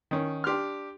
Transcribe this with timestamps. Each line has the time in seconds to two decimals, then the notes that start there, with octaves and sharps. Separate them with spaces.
0.11 D#3 C#4
0.44 D4 G4 C6 F6